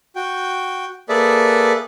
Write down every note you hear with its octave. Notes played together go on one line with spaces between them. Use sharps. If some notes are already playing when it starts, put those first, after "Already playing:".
F#4 G5
A#3 G#4 A4 B4 D5 E5